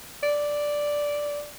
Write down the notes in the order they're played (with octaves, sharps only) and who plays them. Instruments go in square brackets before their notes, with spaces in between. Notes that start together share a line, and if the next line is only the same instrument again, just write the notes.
[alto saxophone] D5